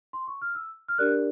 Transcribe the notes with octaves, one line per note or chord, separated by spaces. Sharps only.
C6
C#6
F6
E6
F6
D4 G4 A#4 D5 F#6